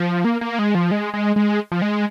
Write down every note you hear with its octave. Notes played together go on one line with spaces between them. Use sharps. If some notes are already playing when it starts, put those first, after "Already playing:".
Already playing: F3
A#3
A#3
G#3
F3
G#3
G#3
G#3
F3
G#3